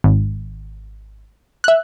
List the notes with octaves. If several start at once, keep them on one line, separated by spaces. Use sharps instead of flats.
G#1
E5 F#6